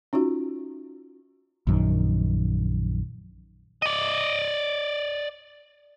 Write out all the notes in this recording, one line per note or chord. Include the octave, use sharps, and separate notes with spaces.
C#4 D#4 F4 F#4
A#1 F#2 D#3
D5 D#5